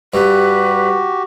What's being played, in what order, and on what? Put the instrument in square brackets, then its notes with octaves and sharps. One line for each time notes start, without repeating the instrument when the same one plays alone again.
[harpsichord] G2 [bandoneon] F#4 G4 [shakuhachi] B4